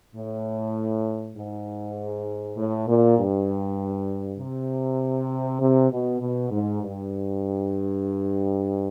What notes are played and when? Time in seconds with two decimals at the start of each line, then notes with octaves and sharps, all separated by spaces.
0.15 A2
1.36 G#2
2.57 A2
2.88 A#2
3.18 G2
4.39 C3
5.60 C3
5.91 B2
6.20 B2
6.51 G#2
6.81 G2